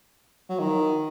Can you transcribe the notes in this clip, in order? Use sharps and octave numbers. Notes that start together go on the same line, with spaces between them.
F#3
D#3